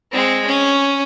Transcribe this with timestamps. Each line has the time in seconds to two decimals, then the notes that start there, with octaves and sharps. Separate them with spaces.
0.12 G#3 C4
0.46 C#4